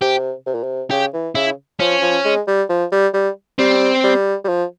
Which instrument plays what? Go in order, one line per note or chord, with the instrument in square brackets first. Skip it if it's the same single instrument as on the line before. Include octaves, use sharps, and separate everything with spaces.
[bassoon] C3 [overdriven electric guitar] G4
[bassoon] C3
A#2
C3
[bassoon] C#3 [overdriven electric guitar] G4
[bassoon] E3
[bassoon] C#3 [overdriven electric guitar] E4
[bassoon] F3 [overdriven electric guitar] C#4
[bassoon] F3
G#3
G3
F3
G3
G3
[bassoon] G3 [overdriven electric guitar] C4
[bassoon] G3
G3
F3